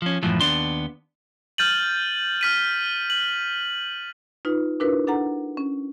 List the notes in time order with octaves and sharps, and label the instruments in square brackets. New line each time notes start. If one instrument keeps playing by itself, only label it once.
[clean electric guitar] F3 C#4
F#2 A2 E3 F3
D#2 B3 D4 C6
[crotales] F6 G6 A6 D#7 F#7
F6 B6 D#7
F#7
[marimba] D#4 F4 B4
D4 E4 F#4 A#4 B4
D4 A4 F#5 A#5
C#4